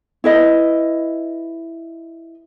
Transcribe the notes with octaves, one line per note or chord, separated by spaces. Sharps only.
E4 B4 D#5